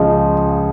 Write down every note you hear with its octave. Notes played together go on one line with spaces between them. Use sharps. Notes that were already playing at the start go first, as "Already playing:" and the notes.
Already playing: C#2 C#3 F3 D#4